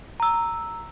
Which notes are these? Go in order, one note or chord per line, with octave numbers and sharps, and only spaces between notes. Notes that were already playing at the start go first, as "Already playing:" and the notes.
A#5 E6